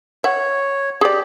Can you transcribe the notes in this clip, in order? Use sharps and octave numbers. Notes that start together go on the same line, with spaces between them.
C#5 E5 F#5
G4 G#4 D5